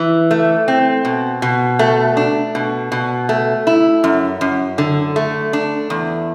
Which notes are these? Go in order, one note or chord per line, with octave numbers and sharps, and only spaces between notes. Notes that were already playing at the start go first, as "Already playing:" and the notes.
Already playing: E3
A3
C4
B2
B2
A3
D4
B2
B2
A3
E4
F#2
F#2
D3
A3
D4
E2